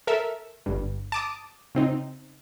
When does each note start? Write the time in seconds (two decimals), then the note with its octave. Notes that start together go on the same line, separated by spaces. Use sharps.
0.07 A4 A#4 E5
0.66 G1 G2
1.12 A5 D6 D#6
1.75 C#3 C4 D#4